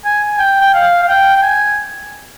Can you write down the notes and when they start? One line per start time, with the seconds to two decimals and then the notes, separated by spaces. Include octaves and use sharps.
0.05 G#5
0.39 G5
0.61 G5
0.74 F5
1.03 F5
1.08 G5
1.37 G5
1.42 G#5